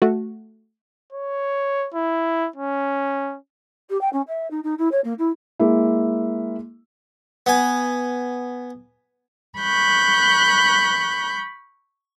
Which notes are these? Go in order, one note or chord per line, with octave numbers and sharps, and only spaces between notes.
A3 F#4
C#5
E4
C#4
G4
G5
C#4
E5
D#4
D#4
E4
C#5
A#3
E4
G#3 A#3 E4
B3 G#5
B5 C#6 F#6 G6